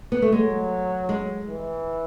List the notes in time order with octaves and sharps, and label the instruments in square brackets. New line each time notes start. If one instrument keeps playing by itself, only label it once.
[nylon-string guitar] B3
A3
[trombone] F#3 [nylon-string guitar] G#3
[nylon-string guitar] G#3
[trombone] E3